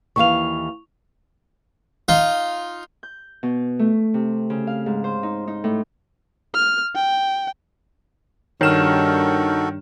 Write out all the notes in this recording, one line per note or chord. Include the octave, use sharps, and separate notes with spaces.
D#2 E3 F5 C#6 F7
D#4 F4
G6
B2
A3
C3
C#3
F5
G#2
C5
D#4
D#4
A2
F6
G5
G2 D#3 F#4 A4 C#5 F6 E7